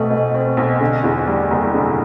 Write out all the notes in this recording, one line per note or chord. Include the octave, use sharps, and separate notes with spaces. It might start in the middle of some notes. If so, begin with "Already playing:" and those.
Already playing: B1 B2 A3 C4
B2
C4
B1
D3
E2
G3
F#1
D3